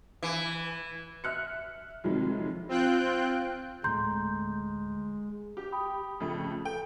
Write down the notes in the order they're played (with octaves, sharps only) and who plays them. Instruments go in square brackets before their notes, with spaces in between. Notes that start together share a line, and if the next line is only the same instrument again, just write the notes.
[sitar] E3
[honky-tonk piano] E5 F6 F#6 C#7
F2 C3 D#3 F#3 G#3
[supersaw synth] C4 F4 G5 F#6 G6
[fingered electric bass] D2 A2 A3 [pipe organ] G#3 [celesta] A#5 C6 G6
[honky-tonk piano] G4
[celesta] G5 B5 D#6
[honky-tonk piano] F2 C#3 A3
[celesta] A4 [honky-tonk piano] G5